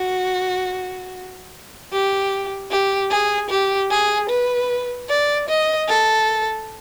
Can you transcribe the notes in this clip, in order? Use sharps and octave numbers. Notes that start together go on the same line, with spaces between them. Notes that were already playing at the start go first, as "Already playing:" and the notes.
Already playing: F#4
G4
G4
G#4
G4
G#4
B4
D5
D#5
A4